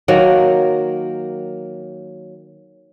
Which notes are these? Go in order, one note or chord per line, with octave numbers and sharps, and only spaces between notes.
D#3 F#3 A#3